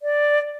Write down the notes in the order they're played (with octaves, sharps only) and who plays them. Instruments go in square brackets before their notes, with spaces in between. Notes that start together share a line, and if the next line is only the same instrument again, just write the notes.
[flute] D5